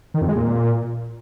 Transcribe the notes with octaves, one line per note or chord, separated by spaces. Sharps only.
D#3
F2
G#3
A#2